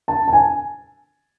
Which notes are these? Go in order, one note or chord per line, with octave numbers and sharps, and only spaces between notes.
A5
A5
G#5